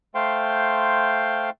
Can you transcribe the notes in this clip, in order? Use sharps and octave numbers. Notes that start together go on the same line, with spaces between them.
A3 C5 F5 G5 C6